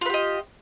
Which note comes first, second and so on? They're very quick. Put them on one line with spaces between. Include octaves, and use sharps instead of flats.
F4 B4 G4 D#5